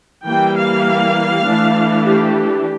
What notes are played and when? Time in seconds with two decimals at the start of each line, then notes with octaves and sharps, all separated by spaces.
0.25 E3 G3 A#3 G5
0.56 F5
1.45 E3 A3 D4
2.05 G4